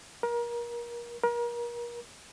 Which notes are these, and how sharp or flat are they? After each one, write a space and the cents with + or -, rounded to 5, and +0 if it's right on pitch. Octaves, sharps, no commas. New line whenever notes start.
A#4 +30
A#4 +35